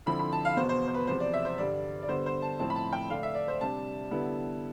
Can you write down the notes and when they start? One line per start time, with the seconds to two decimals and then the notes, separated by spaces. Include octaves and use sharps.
0.06 F2 D3 F3 C4 E4 B5
0.19 B5
0.32 A5
0.45 F5
0.56 E2 B2 B3 C5
0.69 C5
0.88 C5
0.94 B4
1.07 E2 C3 F3 C5
1.20 D5
1.34 E5
1.45 C5
1.58 G2 D3 G3 D5
2.03 D5
2.08 D3 G3 B3 C5
2.26 C5
2.42 A5
2.59 A2 F3 C4 E4 A5
2.70 B5
2.76 A5
2.93 G5
3.10 D3 A3 D4 F5
3.23 E5
3.35 D5
3.48 C5
3.61 C3 G3 D4 A5
4.11 D3 G3 B3 E4